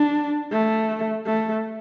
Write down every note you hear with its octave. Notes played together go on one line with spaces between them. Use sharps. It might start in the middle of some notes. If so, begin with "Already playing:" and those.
Already playing: D4
A3
A3